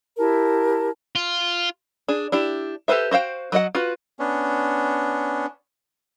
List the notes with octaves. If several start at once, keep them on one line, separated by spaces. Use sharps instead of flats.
E4 G4 A#4 A5
F4
D4 G#4
D4 E4 G4
G4 A4 B4 C5 E5
F#4 C5 F5 G5
F#3 F#4 D#5 F#5
F4 F#4 B4
B3 C#4 D4